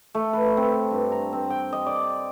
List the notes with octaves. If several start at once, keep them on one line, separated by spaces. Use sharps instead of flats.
A3
B4
C4
G2
A#5
C4
G5
D#5
D5